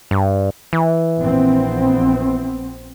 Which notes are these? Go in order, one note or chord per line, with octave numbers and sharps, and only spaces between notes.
G2
E3
A#1 B3 C4